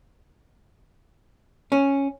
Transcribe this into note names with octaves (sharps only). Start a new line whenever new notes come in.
C#4